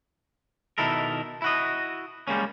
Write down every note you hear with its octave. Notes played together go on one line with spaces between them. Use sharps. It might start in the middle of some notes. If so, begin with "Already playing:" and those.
B2 D#3 E4 A4 A#4
E4 F#4 D#5
G3 G#3 A#3 C#4